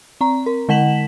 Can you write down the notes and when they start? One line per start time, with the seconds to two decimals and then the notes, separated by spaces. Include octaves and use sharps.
0.21 C4 A#5
0.46 A#4
0.69 D3 G#3 F#5 B6 E7 F#7